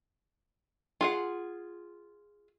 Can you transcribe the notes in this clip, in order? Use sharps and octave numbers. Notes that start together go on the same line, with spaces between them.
F4 G#4 F#5